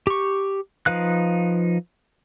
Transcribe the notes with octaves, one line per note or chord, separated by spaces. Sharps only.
G4 C#6
F3 D#4 B4 F5 F#6